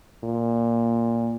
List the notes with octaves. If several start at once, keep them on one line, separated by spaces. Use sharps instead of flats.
A#2